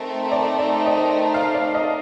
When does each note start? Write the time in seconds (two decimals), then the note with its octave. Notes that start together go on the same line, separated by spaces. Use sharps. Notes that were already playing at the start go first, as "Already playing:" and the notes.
Already playing: A3 C4 D#4 A#4
0.32 D5
0.58 D5
0.86 D#5
1.34 F5
1.55 D5
1.75 D#5